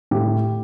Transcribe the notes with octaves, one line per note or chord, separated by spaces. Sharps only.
A2 G4